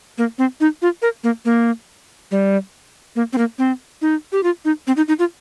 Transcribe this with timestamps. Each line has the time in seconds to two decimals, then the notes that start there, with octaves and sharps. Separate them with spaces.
0.18 A#3
0.38 C4
0.60 D#4
0.82 F4
1.02 A#4
1.24 A#3
1.45 A#3
2.31 G3
3.16 A#3
3.33 C4
3.38 A#3
3.58 C4
4.02 D#4
4.32 G4
4.43 F4
4.65 D#4
4.87 C4
4.97 D#4
5.08 D#4
5.19 F4